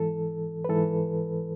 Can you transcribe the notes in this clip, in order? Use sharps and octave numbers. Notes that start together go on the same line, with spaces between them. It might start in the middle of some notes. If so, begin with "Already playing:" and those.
Already playing: G#2 E3 A4
B4
G#2 E3 A4